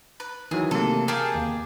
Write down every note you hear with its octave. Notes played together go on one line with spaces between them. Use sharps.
B4
D#3 E3 F#3 G#4
C3 A3 A#3 A4
G4 G#4 A#4 F5 G5 A5
D#2